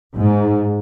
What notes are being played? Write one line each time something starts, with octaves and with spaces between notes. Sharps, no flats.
G#2